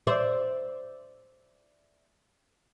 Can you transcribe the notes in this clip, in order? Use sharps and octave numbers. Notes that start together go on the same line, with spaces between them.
C5 D5 E5